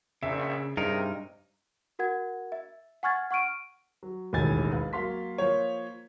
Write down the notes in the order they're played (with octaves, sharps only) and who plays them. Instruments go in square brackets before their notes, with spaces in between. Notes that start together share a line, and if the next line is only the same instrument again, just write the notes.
[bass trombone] A#1 [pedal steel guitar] C#3 [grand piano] E5
[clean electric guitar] G2 D#4 [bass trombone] C3 [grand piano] G#4 [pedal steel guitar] A#4
[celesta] F#4 A#4 F#5 G#6
E5
F#5 G#5 C#6 F6 G#6 A6
F#5 C#6 F6 D7 D#7
[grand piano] F#3
E1 A1 D#2 D#4 G#5 A6
B4 F5
F#3 A#3 F5 C6 B6
F3 A#3 C5 C#5